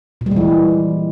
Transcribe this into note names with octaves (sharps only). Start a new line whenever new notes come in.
A#2
G3
G#3
E3